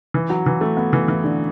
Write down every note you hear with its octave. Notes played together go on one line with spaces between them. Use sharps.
E3
F#3
E3
A3
B3
E3
E3
D3